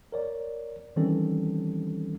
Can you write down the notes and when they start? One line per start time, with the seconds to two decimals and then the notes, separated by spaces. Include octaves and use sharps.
0.12 A#4 C#5 D5
0.96 D#3 E3 G3 C4 C#4 A4